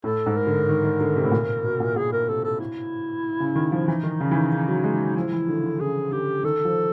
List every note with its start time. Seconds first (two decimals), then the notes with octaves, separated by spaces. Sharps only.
0.04 A2 A4
0.26 G#2
0.36 A#4
0.47 D3
0.69 D#3
0.84 D#3
1.01 D3
1.16 C3
1.24 A2
1.32 A#2
1.64 B2
1.80 A#2
1.96 A#2 G#4
2.13 A#4
2.28 C3 A4
2.44 A4
2.60 E4
3.40 C#3
3.55 D#3
3.72 F3
3.88 E3 D#4
4.03 D#3
4.20 C#3
4.31 E3
4.36 D#3
4.52 C#3
4.68 F#3
4.83 G#3
4.99 F#3
5.16 F3 E4
5.32 E3
5.49 D3
5.64 D3
5.80 C#3 G#4
6.12 D3 G4
6.43 D#3 A4
6.65 F3